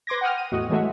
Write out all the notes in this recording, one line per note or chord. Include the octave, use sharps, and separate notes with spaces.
B4 C6 D6 G#6 A#6
F#5 G5 D#6 F6
D#7
E2 A2 F#4 D#5
E3 F#3 G#3 A3 F#4 E5